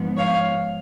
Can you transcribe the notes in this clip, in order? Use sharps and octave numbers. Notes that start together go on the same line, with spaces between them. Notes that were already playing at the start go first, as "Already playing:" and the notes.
Already playing: G#2 F3 B3
C#5 F5